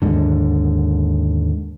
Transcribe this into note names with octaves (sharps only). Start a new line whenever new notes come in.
D#2 G#2 D3